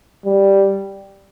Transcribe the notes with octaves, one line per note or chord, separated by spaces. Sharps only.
G3